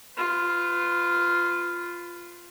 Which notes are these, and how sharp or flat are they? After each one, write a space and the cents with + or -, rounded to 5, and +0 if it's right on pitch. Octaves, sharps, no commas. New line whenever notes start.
F4 +0 B4 +35